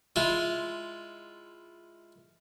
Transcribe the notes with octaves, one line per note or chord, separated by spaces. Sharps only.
G#3 E4 F4